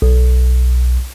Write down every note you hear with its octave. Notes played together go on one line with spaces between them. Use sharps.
B1